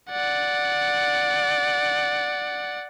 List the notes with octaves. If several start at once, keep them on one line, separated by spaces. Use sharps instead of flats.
D5 F#5